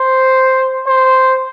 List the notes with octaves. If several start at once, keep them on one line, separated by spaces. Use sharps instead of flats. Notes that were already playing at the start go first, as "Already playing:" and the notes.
Already playing: C5
C5